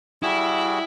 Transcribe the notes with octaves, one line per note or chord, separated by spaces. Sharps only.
G3 E4 F#4 G#4